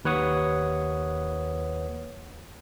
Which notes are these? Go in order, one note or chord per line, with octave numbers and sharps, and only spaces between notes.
D#2 B4 C#5 F#5 D#6